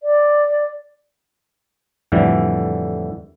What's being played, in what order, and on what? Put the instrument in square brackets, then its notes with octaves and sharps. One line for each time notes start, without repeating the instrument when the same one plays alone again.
[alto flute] D5
[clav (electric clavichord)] F2 A2 D3 E3 G3